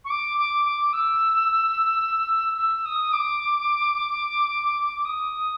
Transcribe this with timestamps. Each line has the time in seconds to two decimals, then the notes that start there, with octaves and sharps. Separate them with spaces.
0.05 C#6
0.10 D6
0.38 D6
0.65 D6
0.93 E6
2.58 E6
2.85 D#6
3.13 D6
5.05 D#6